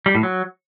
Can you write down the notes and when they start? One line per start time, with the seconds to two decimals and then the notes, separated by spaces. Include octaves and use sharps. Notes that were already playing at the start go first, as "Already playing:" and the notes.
0.06 G3
0.15 A2
0.23 F#3